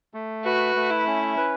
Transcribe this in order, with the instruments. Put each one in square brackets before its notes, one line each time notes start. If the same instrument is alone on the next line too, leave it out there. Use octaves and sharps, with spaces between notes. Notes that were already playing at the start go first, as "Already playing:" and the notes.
[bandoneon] A3
[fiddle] F#4 [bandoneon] B4
[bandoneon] A3
[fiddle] E4
[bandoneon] C#4
B4